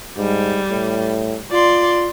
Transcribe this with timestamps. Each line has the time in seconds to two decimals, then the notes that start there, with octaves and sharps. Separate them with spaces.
0.17 G#2 G3
0.70 A2
1.51 F4 D5 C6